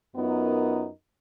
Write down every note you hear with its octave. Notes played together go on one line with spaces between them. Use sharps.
F#2 B3 D#4 F4 A#4